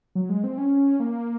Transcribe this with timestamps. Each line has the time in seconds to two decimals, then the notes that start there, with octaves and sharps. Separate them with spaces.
0.15 F#3
0.29 G#3
0.44 C4
0.58 C#4
1.00 A#3